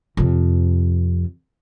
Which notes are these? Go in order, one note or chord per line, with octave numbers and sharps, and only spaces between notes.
F2 C3